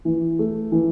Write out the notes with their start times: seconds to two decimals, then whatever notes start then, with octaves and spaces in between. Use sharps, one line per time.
0.05 E3
0.39 A3
0.72 E3